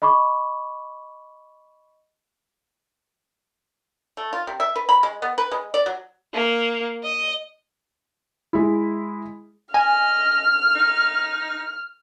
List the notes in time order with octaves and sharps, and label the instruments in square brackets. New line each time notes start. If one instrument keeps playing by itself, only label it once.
[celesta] D#5 B5 C#6 D6
[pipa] A3
F4
C3
E5
B4
B5
G#3
B3
B4
G#3
D5
F#3
[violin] A#3
D#5
[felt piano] G#3 E4
[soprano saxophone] D#5 [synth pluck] G#5 [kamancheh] F6
[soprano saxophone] D#4